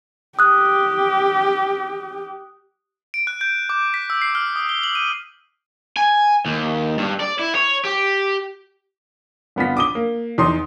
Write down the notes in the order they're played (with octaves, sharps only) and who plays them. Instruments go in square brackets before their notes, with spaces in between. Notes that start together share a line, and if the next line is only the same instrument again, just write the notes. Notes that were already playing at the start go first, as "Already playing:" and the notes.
[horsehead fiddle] G4 [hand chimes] D#6 F#6
[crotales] D7
F#6
G6
D6
B6
E6
C7
F6
D#6
G7
F#7
D#7
[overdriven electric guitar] G#5
D#2
G2
D5
E4
C#5
G4
[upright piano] G1 B3 F4 B6
D6 D#6 G7
A#3
E2 D#4 C6 D#6